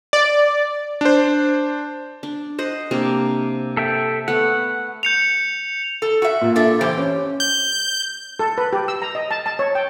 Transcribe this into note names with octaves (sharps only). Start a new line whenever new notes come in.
D5
D4 C5
D4
C5 D#5 F#5
C3 A#3 D4
A4 E5 G5
A3 B3 F#5
G6 C#7 F7
A4
F#4 E5
A#2
D4 A4 E5
E3 G4 C5
C#4
G6
A4
B4
G4
E6
A#5
D#5
A5
A5
C#5
G5